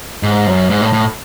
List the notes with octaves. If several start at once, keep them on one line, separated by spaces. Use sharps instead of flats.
G#2
F#2
G#2
A2
A2